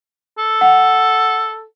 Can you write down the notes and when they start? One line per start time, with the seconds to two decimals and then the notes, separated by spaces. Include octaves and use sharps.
0.38 A4
0.61 F#5